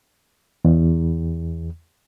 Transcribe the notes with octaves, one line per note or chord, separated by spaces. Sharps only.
E2